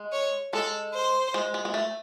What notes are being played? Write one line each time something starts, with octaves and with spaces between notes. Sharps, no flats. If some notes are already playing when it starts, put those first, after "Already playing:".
Already playing: G#3
C#5
G#3 A4
C5
G#3
G#3
G#3
A3